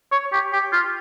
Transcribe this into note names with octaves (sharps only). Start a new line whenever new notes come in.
C#5
G4
G4
F4